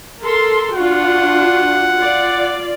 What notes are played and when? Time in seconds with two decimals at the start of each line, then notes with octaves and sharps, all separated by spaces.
0.21 A4 A#4 C6
0.74 D4 F4 F#4 F#5
1.96 F4 D5